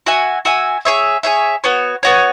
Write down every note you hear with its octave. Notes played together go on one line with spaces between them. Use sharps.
F#4 E5 G#5
F#4 E5 G#5
G#4 C#5 E5
G#4 C#5 E5
B3 F#4 C#5
B3 F#4 C#5